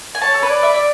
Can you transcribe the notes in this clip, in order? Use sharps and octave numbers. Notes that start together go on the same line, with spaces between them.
G#5
C#5 A5
A4
B4
D5
E5